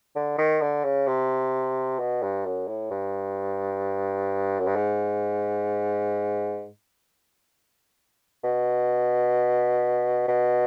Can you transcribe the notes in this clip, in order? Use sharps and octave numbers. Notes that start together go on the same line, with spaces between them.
D3
D#3
D3
C#3
C3
B2
G2
F#2
A2
G2
F#2
G2
G#2
B2
B2